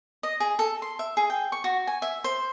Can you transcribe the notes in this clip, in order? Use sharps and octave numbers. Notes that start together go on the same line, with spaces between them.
D#5
G#4
A4
C6
E5
G#4
G5
C#6
F#4
G#5
E5
C5